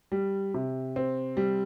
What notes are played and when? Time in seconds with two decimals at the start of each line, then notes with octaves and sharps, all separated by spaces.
0.12 G3
0.54 C3
0.96 C4
1.37 G3